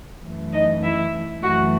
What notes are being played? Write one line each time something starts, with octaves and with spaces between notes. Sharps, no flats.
F#2 E3 A3
D#4 D#5
E4 E5
F#2 E3 A3 F#4 F#5